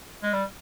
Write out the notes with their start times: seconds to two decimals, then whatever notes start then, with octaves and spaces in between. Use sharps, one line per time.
0.23 G#3
0.33 G3